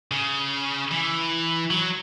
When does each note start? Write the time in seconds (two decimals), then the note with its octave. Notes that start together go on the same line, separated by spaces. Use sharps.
0.11 C#3
0.91 E3
1.70 F#3